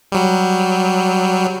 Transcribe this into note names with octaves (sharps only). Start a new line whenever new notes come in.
F#3 G3